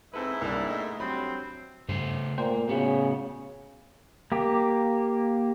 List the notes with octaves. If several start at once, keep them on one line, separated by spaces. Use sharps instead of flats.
G#2 C4 E4 A4 B4
C2 A#3 D4 E5
A3 D#5
G2 F#3 C4 B5
G2 C#3 A3 C5
A#2 A3 A#3 C5 G5
A2 C#3 B3 F#4
A#3 G4